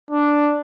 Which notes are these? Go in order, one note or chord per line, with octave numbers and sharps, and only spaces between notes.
D4